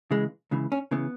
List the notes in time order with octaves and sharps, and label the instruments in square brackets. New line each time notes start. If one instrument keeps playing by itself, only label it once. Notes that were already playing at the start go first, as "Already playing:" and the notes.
[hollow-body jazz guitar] C#2 C#3 E3 G#3
C#2 C#3 E3
C#4
C#3 E3 B3